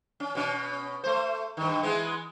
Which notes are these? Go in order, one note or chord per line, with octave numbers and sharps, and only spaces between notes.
C#4
B2 C#4
A3 C5
G2 D#3
E3 G#3 B3